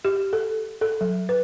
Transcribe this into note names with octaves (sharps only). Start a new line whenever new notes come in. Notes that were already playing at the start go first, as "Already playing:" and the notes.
G4
A4
A4
F#3
B4